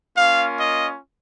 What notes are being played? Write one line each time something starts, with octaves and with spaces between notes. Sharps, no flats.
A#3 C#4 F4 F5
D#5